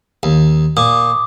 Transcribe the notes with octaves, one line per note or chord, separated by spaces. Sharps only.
D#2
A#2 D6 D#6